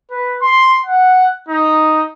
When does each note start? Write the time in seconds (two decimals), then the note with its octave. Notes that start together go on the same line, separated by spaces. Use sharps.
0.11 B4
0.42 C6
0.86 F#5
1.49 D#4